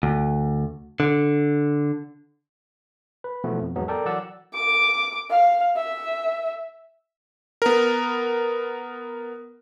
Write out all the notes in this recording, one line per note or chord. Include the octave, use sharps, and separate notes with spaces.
D2
D3
B4
B2 E3 F3 A3 B3
F2
E2 G#2 F#3 G#3 B3
A4 A#4 D5 G5
E3 F#3 D5 F#5 E6
D6
F5
E5
B3 A#4